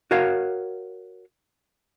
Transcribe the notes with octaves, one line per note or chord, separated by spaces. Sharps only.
F#4 A#4 C#5 F5